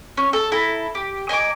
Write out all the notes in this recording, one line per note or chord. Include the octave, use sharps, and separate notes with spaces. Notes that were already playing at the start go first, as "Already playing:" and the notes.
C#4
A4
E4 A4 A#5
G4
D#5 G#5 A#5 D6